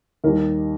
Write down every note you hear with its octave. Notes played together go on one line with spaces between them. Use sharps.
D#2 D#3 G3 A#4